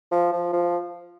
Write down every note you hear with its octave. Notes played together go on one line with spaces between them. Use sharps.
F3
F3
F3